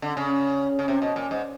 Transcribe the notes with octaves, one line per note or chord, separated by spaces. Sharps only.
D3
C#3
C#3
C3
B2
A#2
G#2